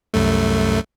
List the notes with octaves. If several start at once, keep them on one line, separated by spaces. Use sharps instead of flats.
C2 F#2 A3